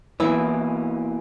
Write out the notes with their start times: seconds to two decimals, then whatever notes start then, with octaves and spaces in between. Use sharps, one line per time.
0.20 B2 E3 A#3 C#4 E4